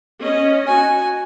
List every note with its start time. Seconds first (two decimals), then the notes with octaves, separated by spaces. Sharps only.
0.21 C#4 D#5
0.67 F#4 G#5